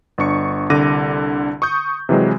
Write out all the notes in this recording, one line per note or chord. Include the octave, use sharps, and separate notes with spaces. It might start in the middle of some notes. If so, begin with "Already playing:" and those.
G1 D4 C#6 C#7
C2 D3 D6 A#6 D#7
C#6 D#6 G6
C3 E3 F#3 G#3